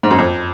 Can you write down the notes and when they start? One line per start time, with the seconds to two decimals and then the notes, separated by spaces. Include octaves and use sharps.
0.03 G#2
0.10 F#2
0.18 F2